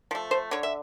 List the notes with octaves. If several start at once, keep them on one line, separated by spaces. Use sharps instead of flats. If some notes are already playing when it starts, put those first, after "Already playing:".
F3 A3
C5
D3 C#5
E5